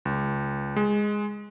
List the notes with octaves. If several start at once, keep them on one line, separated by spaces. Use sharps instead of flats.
C#2
G#3